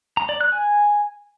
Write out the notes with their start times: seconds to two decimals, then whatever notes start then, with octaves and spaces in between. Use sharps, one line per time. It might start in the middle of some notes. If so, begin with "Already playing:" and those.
0.17 A#5
0.29 D5
0.41 F#6
0.52 G#5